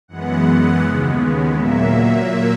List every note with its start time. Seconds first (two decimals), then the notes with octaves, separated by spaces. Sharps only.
0.08 F#2 E3 G#3 B3 F#5
0.45 F#5
0.82 D#2 C#3 G#3 B3
1.56 A#2 F#3 A#3 E5